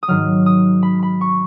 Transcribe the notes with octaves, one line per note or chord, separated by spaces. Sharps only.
D#6
G#2 D#3 F#3 F6
D#6
B5
B5
C#6